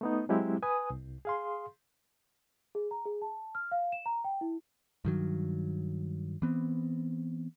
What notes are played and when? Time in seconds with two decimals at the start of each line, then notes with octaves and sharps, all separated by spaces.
0.01 A3 B3 D#4
0.29 F#3 G#3 C4 E4 G4
0.62 B4 G#5 D#6
0.90 C2
1.25 G#4 F5 C6
2.75 G#4
2.91 A#5
3.05 G#4
3.22 A5
3.55 F6
3.71 F5
3.92 E7
4.06 A#5
4.24 G5
4.41 E4
5.05 G2 D#3 F#3
6.42 E3 B3 C4